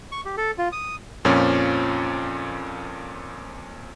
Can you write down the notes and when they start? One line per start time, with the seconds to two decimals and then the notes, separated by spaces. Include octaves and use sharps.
0.12 C#6
0.25 G4
0.37 A4
0.58 F4
0.72 D#6
1.25 F2 A#2 F3 C#4